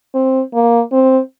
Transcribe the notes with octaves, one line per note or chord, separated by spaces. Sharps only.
C4
A#3
C4